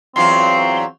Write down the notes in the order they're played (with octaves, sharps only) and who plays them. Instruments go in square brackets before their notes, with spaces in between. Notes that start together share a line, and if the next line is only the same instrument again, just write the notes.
[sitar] E2 F#3 F4 [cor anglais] C4 [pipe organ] C6